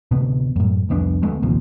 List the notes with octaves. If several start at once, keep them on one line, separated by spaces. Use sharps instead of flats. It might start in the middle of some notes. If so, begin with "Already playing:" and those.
A1 D2 C3 B3
F#2 A2
C2 F2 B3 D4
D2 G#3 A3 B3
A#1 D#2 C3 F3